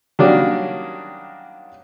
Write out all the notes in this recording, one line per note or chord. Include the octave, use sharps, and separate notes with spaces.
D#3 F#3 G3 A#3 C#4 D4